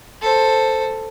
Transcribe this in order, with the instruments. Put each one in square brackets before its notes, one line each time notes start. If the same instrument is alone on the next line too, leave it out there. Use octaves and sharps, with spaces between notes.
[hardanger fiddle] A4 C5